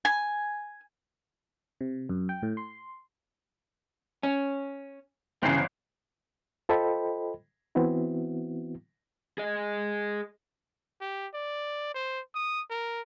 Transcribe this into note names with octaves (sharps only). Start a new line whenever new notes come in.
G#5
C3
F#2
G5
A2
C6
C#4
G1 C#3 E3 C4 C7
F4 A4 C5 D#5 G5 B5
E3 B3 C4 E4 F#4
G#4 D#5
G4
D5
C5
D#6
A#4